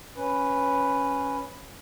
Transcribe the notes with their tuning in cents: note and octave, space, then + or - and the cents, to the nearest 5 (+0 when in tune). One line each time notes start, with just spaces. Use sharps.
C#4 -5 B4 +0